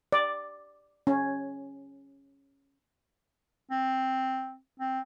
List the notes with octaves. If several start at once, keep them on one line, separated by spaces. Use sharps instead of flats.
D5
C#4
C4
C4